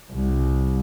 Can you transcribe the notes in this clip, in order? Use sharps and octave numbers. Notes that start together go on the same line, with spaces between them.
C2